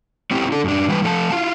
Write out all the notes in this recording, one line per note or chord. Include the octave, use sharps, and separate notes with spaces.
C4 C#4 E4 G4
D4 A4
F#2 D4
E3 G3 A4 B4
F3 A3 A#4 A5
E4 F4 F5